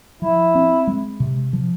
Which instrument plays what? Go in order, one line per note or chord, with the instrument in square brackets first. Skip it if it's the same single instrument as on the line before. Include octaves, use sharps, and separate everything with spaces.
[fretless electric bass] F3 [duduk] E4
[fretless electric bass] C4
G#3
C3
F3